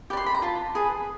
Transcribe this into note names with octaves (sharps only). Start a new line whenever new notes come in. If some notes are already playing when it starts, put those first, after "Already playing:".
G4 B4 D5
C6
B5
A#5
F4 A5
G#4 B4